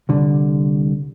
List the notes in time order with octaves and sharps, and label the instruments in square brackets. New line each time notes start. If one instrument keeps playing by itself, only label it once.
[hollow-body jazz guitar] C2 D3